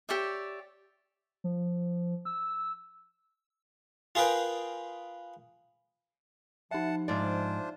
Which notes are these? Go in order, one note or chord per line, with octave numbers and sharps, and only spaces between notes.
G4 C#5 D5 E5
F3
E6
F4 G#4 A#4 B4 G5
F3 D#4 E5 F#5 A5
G#2 D4 F4 C5 D5